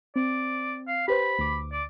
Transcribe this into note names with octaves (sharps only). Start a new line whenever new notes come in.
C4 D5
F5
G4 B4 C5 B5
D2 D6
D5